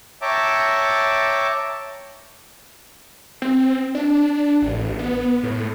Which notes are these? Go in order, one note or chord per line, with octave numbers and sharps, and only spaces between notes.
C#5 E5 G5 A5 A#5 D6
C4
D4
A1
B3
A2